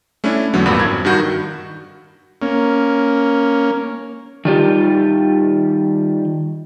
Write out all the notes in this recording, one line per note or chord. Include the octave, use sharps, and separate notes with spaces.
A3 C#4 D4 E4
E2 D3 F#3 B3
G#1 G2 A#2 F#4 B5
F2 G#6
G2 D#3 F#4 G6
A#3 C#4
D#3 G3 F4 G4